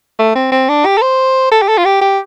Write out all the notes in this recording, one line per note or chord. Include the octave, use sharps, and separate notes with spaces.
A3
C4
C4
D4
G4
A4
C5
A4
G4
A4
F4
G4
G4